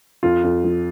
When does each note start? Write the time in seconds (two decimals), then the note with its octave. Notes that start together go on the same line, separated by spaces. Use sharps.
0.23 F2 F4
0.44 F2
0.64 F3